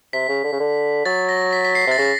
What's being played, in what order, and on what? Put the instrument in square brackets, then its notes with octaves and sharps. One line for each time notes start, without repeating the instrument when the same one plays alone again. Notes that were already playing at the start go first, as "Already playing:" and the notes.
[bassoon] C3 [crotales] B6
[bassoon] C#3
D3
C#3
D3
[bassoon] F#3 [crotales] A6
[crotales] A#6
B6
B6
C7
[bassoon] C3 [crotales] A6
[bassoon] C#3 [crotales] A#6